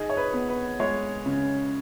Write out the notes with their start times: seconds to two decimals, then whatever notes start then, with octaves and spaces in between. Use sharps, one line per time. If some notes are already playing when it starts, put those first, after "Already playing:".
Already playing: D#4 G#4
0.09 C#5
0.17 B4
0.33 B3
0.49 B4
0.79 G#3 C#5
1.26 C#3